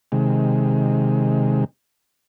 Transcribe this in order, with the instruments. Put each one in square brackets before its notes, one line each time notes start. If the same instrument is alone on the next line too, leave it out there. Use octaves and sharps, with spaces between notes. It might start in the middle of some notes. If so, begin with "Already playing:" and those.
[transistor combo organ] C3 D#3 G#3